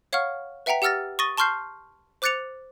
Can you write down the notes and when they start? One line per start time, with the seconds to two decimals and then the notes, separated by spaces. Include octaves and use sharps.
0.13 C#5 F5 F#5 C#6 F6
0.66 B4 E5 F#5 G5 A#5 B6
0.82 G4 F#5 E6 F6 A6 A#6
1.19 C#6 D#6 A6 A#6 D#7 G7
1.38 A5 C6 C#6 F6 G6 C7
2.22 C5 D6 F#6 A6 C#7 F7